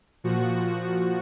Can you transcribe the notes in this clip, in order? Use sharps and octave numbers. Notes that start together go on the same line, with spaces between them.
A#2 F3 F#4